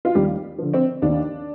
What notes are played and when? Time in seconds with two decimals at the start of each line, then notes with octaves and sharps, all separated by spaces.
0.05 F4
0.15 D#2 G3 G4
0.58 D3 F3
0.73 C4
1.02 D#2 D4